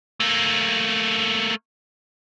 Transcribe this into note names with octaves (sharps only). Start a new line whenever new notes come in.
A3 A#3